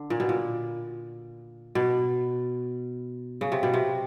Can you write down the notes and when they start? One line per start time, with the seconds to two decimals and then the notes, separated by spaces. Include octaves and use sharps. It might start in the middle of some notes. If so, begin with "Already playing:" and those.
Already playing: D3
0.10 A#2
0.20 B2
0.29 A#2
1.75 B2
3.41 C#3
3.52 C3
3.63 B2
3.74 C3